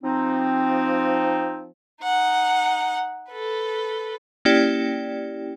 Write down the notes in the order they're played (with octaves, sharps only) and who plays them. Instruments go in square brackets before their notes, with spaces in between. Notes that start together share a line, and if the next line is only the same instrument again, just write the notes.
[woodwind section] F3 C4 D#4
[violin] D#4 F#5
A4 B4
[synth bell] A#3 C#4 E4 G4 D5 G5